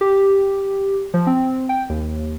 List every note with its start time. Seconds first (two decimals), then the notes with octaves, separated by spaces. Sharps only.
0.01 G4
1.14 F3
1.27 C4
1.69 G5
1.89 D#2